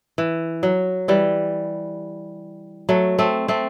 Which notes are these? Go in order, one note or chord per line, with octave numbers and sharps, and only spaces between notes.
E3
F#3
E3 G3
F#3 A3
A3 C4
A3 C4